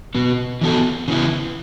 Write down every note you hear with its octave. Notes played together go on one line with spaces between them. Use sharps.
B2 B3 F#4
E3 B3 F#4 A4
C#3 E3 B3 E4